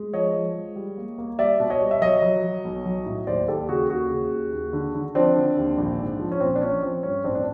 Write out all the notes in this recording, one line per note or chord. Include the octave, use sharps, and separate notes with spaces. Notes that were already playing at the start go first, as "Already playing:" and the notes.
Already playing: G#3
F3 C#5 D#5
F3
G#3
G3
A#3
A#3
G3 D5 E5
B2
C#5 D#5
G3
E5
F#3 C#5 D#5
F#3
F#3
B1
F#3
A2
D#2 C5 D5
D#2 G4 A4
C#3 F#4 G#4
D#2 F#4 G#4
C#3
D#2
D#2
D3
D3
F3 C4 D4
D3
D#2
A#1
G#2
F3
C#4
A#1 C4
D4
F3 C#4
F3 C4
G2 C#4
A1 C4 D4
D4